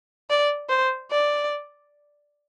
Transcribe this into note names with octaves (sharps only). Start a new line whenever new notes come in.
D5
C5
D5